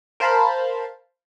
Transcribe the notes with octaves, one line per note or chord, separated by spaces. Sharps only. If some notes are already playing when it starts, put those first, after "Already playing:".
A#4 C5 F5 A5 B5